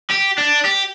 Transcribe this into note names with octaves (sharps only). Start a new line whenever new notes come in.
G4
D4
G4